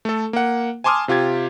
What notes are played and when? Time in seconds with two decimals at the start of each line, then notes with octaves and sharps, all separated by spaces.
0.05 A3 A4
0.33 A#3 F#5
0.84 G#5 A5 C6 D6 D#6 F6
1.08 C3 F4 G4 G#6